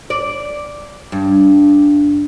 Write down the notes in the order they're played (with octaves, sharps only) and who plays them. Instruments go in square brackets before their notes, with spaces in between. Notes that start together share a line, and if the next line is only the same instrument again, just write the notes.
[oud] D5
G2